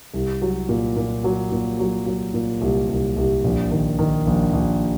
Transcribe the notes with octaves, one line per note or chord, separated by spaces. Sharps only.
C2
F#3
A#2
A#2
F#3
A#2
F#3
F#3
A#2
C2
C2
C2
A#1
D#3
D#3
A#1
A#1